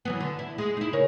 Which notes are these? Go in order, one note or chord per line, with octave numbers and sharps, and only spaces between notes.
E3 F#3 B3
D3
E4
G#3
D#4 E4
C#3 A#4 C#5